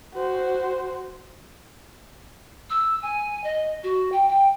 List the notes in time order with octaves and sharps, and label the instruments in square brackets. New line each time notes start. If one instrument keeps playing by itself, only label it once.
[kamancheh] F#4 C5
[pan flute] E6
G#5
D#5
F#4
G5
G5